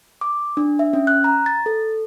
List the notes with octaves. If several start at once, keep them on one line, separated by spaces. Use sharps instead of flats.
D6
D4
E5
C#4
F#6
A#5
A6
A4